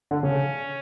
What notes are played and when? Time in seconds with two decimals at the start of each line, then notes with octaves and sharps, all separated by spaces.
0.11 D3
0.23 C#3 C#4